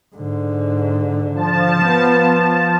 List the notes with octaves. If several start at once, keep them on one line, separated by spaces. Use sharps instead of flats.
G#2 D3
F3 A5
B3